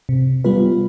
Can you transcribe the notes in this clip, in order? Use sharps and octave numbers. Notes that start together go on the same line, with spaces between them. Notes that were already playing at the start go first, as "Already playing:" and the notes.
C3
G3 B3 F4 B4